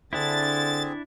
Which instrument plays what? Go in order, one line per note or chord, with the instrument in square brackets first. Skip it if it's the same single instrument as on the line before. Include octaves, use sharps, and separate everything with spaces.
[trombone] D3 [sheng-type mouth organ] C4 G#4 [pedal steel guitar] D4 E4 [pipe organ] A6